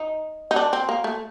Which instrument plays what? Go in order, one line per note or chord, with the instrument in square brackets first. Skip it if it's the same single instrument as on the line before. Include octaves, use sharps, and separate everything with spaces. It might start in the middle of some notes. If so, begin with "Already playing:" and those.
Already playing: [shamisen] D#4
D#4
D4
C4
A#3
A3